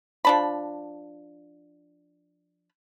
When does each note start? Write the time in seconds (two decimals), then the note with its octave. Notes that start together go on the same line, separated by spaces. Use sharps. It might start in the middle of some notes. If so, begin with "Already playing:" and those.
0.25 F3 D4 B5